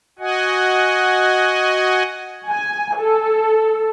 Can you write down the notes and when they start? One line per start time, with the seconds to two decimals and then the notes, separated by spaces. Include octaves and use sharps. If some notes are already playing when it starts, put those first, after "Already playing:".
0.19 F#4 D#5 F#5 G#5
2.48 G#5
2.98 A4